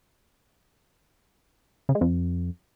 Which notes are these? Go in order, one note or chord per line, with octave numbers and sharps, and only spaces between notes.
C#3
G#3
F2